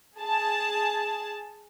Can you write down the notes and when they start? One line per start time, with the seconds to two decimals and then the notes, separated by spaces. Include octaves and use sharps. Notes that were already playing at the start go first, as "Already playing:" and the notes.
0.20 G#4 A5